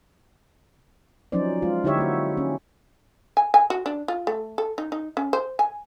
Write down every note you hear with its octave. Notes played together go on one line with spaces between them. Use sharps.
F3 F#3 C#4 D#4 C5 D5
G#3 F4
D3 D#4 E4 G4 C#5 E5
A#3 F#4
C#4
G#5
G#5
F#4
D4
F4
A3
A4
D#4
D#4
C#4
C5
G#5